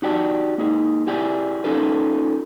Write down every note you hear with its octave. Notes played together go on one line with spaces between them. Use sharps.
D#4 F#4 G4 D5 A5
A#3 D#4 G#4
E4 G4 G#4 D5
C#4 D#4 F4 A4 B4